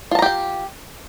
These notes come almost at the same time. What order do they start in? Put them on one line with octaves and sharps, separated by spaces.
F4 A5 A#5 G4 G5